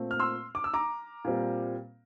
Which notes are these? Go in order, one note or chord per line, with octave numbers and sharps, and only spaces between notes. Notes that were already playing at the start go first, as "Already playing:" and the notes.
Already playing: A#2 A3 C4
F6
C6 E6
D6
E6
A#5 D6
A#2 G3 C4